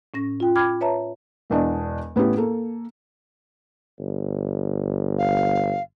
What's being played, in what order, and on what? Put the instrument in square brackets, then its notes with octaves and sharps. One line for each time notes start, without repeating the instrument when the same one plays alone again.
[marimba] A2 C#4 A#6
F4 G5
G5 B5 D6 F6 G#6
B4 C#5 E5 A5 A#5
[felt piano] E1 E2 D4 D#5
A2 B3 C#4 E4 G4
A#3 A4
[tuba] G1
[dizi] F5